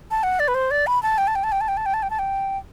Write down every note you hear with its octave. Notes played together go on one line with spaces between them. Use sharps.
A5
F#5
D5
B4
C5
D5
B5
A5
G5
A5
G5
A5
G5
A5
G5
A5
G5
A5
G5
A5
G5